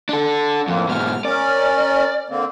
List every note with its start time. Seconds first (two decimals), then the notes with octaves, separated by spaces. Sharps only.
0.09 D4 A4
0.68 F2 A2 A#3
0.89 G#2 B2 F6
1.25 C#4 A#4 D5
2.29 D3 A#3 C4